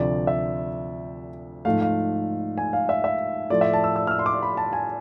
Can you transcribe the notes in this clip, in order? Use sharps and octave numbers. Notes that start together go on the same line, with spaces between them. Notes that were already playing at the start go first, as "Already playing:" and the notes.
Already playing: D2 C3 F3 D5
E5
G#2 F3 A3 F5
F5
G#5
F5
E5
E5
A2 F3 A3 D5
E5
A5
E6
E6
F6
E6
C6
D6
B5
A5
G#5